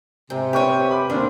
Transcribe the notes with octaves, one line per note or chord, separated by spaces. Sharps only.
G#2 C3
G4 B4 C#5 C#6 D#7
B5 D6
D#2 C4 D4 A#4